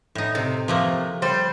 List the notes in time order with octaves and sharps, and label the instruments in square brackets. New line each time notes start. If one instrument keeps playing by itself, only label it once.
[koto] A2 D#4
[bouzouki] C3
[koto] F3 A3 A#3
[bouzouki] G3 C5